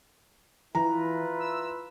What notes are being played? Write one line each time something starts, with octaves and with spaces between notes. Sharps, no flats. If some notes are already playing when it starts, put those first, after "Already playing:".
E3 E4 F4 B4 A#5
E6